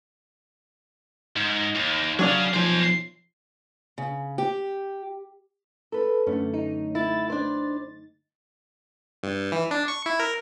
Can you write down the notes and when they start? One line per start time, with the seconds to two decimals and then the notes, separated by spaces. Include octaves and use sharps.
1.36 G#2
1.75 D#2
2.19 F#3 D4 G#4 D5 F5
2.53 B1 F3 C5 G#5
3.98 C#3
4.38 G4
5.92 A4 B4
6.27 F#2 D3 A3 C#4
6.54 D#4
6.95 E4 A6
7.30 D4 C5
9.23 G2
9.52 E3
9.71 D4
9.88 C#6
10.06 E4
10.20 A#4